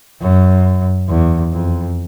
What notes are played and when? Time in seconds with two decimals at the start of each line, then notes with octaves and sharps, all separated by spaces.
0.21 F#2
1.09 E2
1.52 F2